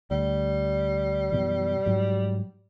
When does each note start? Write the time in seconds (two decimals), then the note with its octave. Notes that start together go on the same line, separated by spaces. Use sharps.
0.11 D2 G3
1.32 F#2 B2 E3
1.86 G#2 F#3